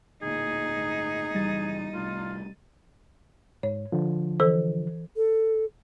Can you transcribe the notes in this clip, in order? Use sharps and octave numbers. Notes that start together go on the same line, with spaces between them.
D1 D2 A#2 D#4 G#4
G1 A2
F#1 D3 E3 G3 A6 D#7
C2 A2 F4
G#2 C#5
D3 F3
E3 A4 C5
A4